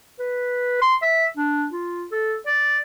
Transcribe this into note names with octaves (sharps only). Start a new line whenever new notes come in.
B4
C6
E5
D4
F4
A4
D5